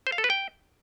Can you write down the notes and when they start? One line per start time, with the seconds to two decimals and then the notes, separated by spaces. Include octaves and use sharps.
0.07 C5
0.12 F5
0.18 A4
0.24 B4
0.30 G5